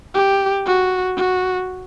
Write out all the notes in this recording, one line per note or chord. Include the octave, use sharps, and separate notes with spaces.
G4
F#4
F#4